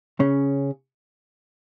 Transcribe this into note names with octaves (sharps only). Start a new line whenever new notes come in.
C#3 C#4